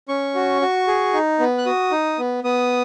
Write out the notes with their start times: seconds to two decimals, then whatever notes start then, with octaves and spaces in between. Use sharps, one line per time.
0.09 C#4 C#6
0.35 F#4
0.61 F#4
0.87 G#4
1.13 D#4
1.39 B3
1.58 F#6
1.66 F#4 D#6
1.92 D#4
2.18 B3
2.44 B3 D#6